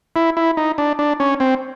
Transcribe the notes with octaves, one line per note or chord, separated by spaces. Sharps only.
E4
E4
D#4
D4
D4
C#4
C4